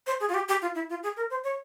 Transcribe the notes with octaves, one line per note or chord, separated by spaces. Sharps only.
C5
G#4
F4
G4
G4
F4
E4
F4
G#4
A#4
C5
C#5